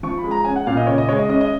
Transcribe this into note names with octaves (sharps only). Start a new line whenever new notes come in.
F3 C#6
B5
G#3
A#5
C#4 G#5
F#5
A#2 F5
D#5
C#3 C#5
D#5
G#3 C#5
D#5
C#4 D#5
D#5